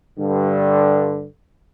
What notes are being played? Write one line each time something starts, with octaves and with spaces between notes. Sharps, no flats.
G2 D3